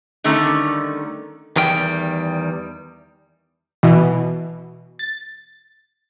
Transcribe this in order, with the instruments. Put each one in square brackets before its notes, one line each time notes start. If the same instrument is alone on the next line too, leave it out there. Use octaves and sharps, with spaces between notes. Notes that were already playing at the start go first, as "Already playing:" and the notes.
[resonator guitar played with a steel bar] D3 D#3 G3 A3 C#4 D#4
[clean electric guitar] E2 D#3 G3 G5
[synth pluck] B2 E3
A6